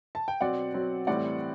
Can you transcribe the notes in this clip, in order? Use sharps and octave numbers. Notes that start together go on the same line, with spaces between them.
A5
G5
B2 F#3 C4 D5 F#5
B2 F#3 C4
A2 E3 G3 C4 D5 F#5